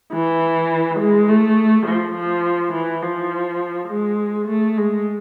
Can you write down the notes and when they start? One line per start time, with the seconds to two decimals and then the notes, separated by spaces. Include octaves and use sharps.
0.13 E3
0.99 G#3
1.29 A3
1.86 F3
2.15 F3
2.73 E3
3.02 F3
3.89 G#3
4.48 A3
4.77 G#3